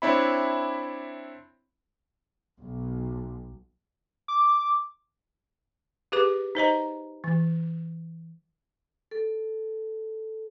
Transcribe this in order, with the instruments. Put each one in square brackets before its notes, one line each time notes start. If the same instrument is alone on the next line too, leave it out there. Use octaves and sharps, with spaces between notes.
[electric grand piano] C4 D4 E4 C#5 E5 B5
[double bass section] B1
[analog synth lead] D6
[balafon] G4 G#4 B4 D6
D#4 C5 D#5 A#5
E3
[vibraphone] A4